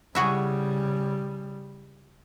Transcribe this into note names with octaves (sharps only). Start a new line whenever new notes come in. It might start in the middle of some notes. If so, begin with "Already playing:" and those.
C#3 G3 E4 F#4 G#4